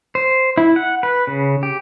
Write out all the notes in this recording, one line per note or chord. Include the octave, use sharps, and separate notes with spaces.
C5
E4
F#5
B4
C#3
G4